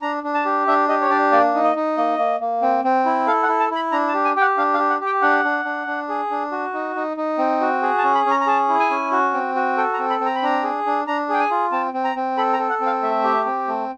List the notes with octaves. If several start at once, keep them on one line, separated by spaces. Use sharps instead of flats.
D4 A#5
D4
A5
G4
D4 E5
G4 D#5
C#5
D4 D5
A#3 D5
D#4
D#5
D#4
A#3 D#5
A#3
A#3
C4
C4
E4
A4 F5
F#5
E4
A5
E4 B5
D4 A#5
A5
G4
G#5
G4 G5
F#5
D4 F5
F5
G4
F#5
G4
G5
D4 F#5
D4
D4
D4
G#4
D4
F#4
D#4
D#4
D#4
C4
F#4
G#4
A5
C#4
B5
C#4 A#5
A#5
G#4 A5
E4
G#5
C#4
F#4
C4
F#4
A4 G5
A#5
C4
B5
C4
A#5
B5
D4 A#5
G#4
D4
D4 A#5
G#4 G5
G#5
F4
C4 A5
C4
A#5
C4
A4 B5
A#5
A4
F#5
C4
F5
A3 E5
G4
C4
A3